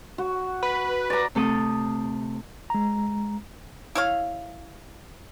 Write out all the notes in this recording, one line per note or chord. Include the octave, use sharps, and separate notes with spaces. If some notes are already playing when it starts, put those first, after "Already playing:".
F#4
B4
D5 A#5
C3 A3 A4 D#6
G#3 A#5
E4 C#5 F5